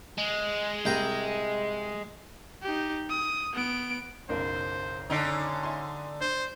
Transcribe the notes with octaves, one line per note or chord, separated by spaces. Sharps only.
G#3
C2 G5 A#5
D#4 G4
D#6
B3 D7
F#1 B1 A#4 C5
D3 C#4 D#4
E5 G#5 C6
D4 C5